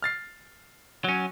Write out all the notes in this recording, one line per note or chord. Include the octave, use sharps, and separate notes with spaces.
F6 A6 C7
F#3 C#4